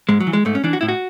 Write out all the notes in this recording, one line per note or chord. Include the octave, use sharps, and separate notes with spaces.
G#2 G#3
F#3
E3
G#3
G#2 A3
C#4
E3 D4
F#4
A2 E4
F#4